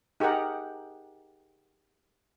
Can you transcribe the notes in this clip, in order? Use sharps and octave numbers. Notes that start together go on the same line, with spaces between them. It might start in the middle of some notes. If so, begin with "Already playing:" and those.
D#4 G4 G#4 A#4 F#5